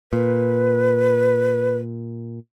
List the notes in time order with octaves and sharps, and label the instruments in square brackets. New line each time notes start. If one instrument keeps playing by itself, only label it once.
[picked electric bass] A#2 [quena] B4